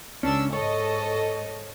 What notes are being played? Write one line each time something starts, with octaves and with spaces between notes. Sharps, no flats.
C#2 C#4 D4 E6
G#2 A4 C#5 D#5